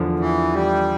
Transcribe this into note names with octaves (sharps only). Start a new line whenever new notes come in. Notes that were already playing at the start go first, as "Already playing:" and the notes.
Already playing: E2 D3 F3
E3
G3